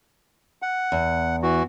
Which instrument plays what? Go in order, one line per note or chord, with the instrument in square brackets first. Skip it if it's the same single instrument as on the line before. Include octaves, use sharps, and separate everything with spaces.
[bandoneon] F#5
[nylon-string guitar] E2
[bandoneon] E3 F#4